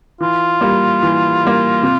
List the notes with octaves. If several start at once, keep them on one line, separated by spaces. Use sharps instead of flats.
E3 F4
G3 A#3
E3
G3 A#3
C3